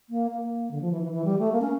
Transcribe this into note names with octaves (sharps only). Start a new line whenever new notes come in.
A#3
A#3
D3
F3
E3
E3
E3
G3
A3
A#3
C#4